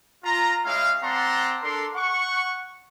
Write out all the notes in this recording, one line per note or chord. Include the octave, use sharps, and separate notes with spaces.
F4 A#5
G#3 C#4 E4 F5
C4 D5 F#5 A5 A#5 C6
D4 A4 A#4 C6
F#5 C#6